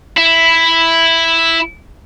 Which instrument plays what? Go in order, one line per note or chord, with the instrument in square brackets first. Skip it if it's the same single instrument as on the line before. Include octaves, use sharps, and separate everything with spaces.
[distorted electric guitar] E4 E5